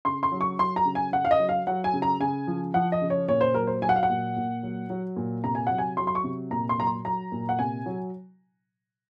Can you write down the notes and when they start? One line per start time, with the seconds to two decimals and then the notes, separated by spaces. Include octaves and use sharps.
0.05 C#3 C6
0.23 C6
0.32 F#3
0.41 C#6
0.59 F#3 C6
0.76 A#5
0.85 C#3
0.95 G#5
1.12 C#3 F#5
1.25 F5
1.31 D#5
1.40 F#3
1.49 F5
1.67 F#3 F#5
1.84 G#5
1.93 C#3
2.02 A#5
2.20 C#3 G#5
2.47 F3
2.74 F3 F#5
2.92 D#5
3.02 C#3
3.10 C#5
3.28 A#2 C#5
3.41 C5
3.54 F#3 A#4
3.67 C5
3.82 F#3 G#5
3.89 F#5
3.96 F5
4.03 F#5
4.09 A#2
4.36 A#2
4.63 F#3
4.90 F#3
5.16 A#2
5.44 C3 A#5
5.55 G#5
5.67 F#3 F#5
5.78 G#5
5.97 F#3 C6
6.07 C6
6.15 C#6
6.24 C3
6.51 A#2 A#5
6.69 C6
6.78 F#3 A#5
6.87 C6
7.05 F#3 A#5
7.32 A#2
7.49 F#5
7.59 C3 G#5
7.86 F#3